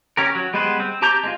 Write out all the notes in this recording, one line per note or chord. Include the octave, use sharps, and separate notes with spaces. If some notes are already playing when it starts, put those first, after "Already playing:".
C#4 G4 A#4
F#3
G3 G#3 B3 B4 C5
C4
G4 A5 A#5 D6 G6
G#3 C4 F4